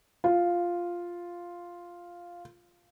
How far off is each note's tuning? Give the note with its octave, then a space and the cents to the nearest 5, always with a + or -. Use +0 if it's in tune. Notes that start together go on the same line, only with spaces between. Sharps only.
F4 +0